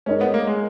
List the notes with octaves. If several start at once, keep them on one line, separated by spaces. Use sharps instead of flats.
G#3 C#4 D#4 A#4 C#5
B3
A#3
G#3